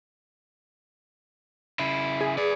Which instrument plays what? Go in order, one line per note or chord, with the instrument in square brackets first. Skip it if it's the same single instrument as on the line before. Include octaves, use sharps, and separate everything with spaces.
[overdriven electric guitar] C#3 E4
[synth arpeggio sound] G#4
[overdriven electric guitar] B4 D5